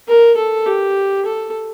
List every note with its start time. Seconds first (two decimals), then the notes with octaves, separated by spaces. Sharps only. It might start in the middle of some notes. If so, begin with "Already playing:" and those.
0.08 A#4
0.37 A4
0.67 G4
1.26 A4